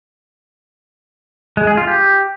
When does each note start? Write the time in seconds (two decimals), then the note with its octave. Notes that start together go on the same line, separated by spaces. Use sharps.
1.57 G#3
1.67 G#4
1.77 F4
1.87 G4